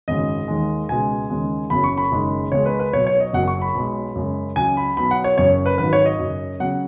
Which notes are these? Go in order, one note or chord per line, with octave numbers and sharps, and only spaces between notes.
G#1 F#2 C#3 G#3 D#5
D#2 D#3 G#3
C#2 B2 G#3 G#5
D#2 C#3 G#3
F#1 F#2 C#3 F#3 B5
C#6
B5
F#1 F#2 D#3 G#3
C#2 C#3 G#3 C#5
B4
B4
B1 B2 F#3 C#5
C#5
D#5
F#1 F#2 F#3 F#5
C#6
B5
B1 B2 G#3
F#2 C#3 G#3
C#2 C#3 F#3 G#5
B5
B1 B2 F#3 B5
F#5
C#5
F#1 F#2 F#3 C#5
B4
G#1 G#2 F#3 B4
C#5
D#5
F#2 C#3 F#3
C#3 F#3 F#5